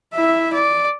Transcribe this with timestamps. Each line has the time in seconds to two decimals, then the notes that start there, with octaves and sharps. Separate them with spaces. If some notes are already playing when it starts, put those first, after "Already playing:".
0.14 E4 E5
0.53 D5